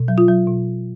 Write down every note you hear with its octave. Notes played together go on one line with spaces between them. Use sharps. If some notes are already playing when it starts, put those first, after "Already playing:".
Already playing: B2
F#3
F4
F#3
B2